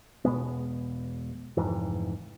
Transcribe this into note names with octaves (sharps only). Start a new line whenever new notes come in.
E1 B2 G#3 B3
F1 F2 G#2 E3